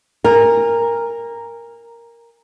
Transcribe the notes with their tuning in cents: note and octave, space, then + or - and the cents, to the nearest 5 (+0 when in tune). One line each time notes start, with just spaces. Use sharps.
A#4 +0 G#5 -35